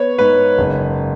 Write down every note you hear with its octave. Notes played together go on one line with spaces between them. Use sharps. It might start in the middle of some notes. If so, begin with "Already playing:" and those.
Already playing: B3 C#5
G#2 B4
F#1